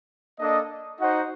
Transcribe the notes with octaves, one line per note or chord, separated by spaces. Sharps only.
A#3 D4 A4 D#5
D#4 F#4 C5 D#5 F#5